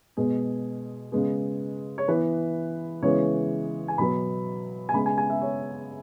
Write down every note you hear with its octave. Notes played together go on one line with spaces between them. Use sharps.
B2 G#3 B3 G#4
C#3 G#3 B3 G#4
C#5
E3 B3 B4
C#3 E3 G#3 B3 C#5
G#5
B2 F#3 B3 B5
G#5
C#3 G#3 B3 B5
G#5
G#5
E5
C#5